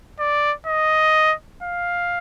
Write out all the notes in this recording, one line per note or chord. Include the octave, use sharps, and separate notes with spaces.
D5
D#5
F5